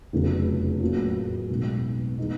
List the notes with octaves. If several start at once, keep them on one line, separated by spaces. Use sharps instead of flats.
F1 E2 C#3 F#3
A2 F#3 A#3 C#4
B1 B2 G#3
A2 E3 G#3 B3 D#4